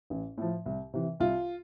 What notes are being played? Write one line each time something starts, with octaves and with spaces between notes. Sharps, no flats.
A1
A2 F3
C2
C3 E3
C2 F4